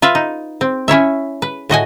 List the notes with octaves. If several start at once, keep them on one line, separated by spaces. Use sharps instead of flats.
F4 B4 E5
D#4
C4
C#4 E4 C#5 E5
B4
A2 F#4 D#5 G#5